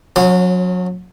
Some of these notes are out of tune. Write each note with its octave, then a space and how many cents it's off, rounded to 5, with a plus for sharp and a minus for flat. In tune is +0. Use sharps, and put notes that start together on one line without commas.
F#3 -30 C#4 +5 C6 -35